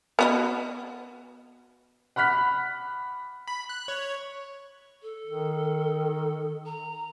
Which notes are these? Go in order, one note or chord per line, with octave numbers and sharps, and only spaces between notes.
B3 F#4 D#5
F#5 B5 F6 F#6 B6
B5
F#6
C#5
A4
D#3
A#5